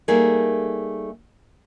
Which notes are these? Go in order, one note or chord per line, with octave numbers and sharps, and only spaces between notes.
G3 A3 A#3 D#4 G#4 A#4